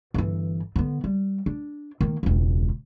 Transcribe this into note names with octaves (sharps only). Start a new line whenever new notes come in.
G1 E3
D3 B3
G3
D4
D#3 A#3
E1 C#2